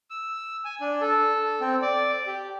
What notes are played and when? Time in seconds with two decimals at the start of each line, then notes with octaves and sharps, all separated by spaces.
0.10 E6
0.65 G#5
0.81 D4
1.01 A4
1.61 C4
1.82 D5
2.27 G4